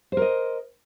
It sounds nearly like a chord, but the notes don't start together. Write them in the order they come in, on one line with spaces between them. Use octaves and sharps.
C5 A#4 D#5